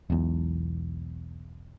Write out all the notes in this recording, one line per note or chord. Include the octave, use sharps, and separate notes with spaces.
E1 B1 E2